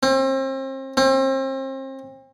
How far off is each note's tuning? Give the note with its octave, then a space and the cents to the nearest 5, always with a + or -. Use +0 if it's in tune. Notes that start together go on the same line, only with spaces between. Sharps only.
C4 +35
C4 +35